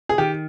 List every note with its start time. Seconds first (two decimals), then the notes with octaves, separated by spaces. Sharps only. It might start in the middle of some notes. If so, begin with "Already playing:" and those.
0.09 G#4
0.18 D#3 G4